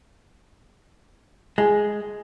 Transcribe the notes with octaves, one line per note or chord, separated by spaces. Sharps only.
G#3 G#4 G#5